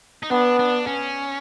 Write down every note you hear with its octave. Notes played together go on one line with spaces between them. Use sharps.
D#4
B3 D4
D4
C#4